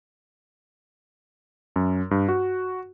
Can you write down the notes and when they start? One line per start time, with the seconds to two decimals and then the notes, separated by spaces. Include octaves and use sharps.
1.76 F#2
2.11 G2
2.29 F#4